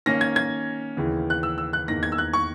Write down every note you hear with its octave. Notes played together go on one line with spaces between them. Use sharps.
D#3 A#3 C#4 A#6
G#6
G#6
D#2 C#3 E3 B3
F#6
E6
E6
F#6
E2 D#3 A#3 A#6
G#6
E6
F#6
C#6